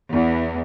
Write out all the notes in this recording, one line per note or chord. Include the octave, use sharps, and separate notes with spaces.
E2